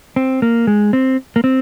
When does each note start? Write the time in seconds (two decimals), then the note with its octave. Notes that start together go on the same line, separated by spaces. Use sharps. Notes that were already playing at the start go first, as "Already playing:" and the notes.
0.16 C4
0.42 A#3
0.67 G#3
0.93 C4
1.36 A#3
1.44 C4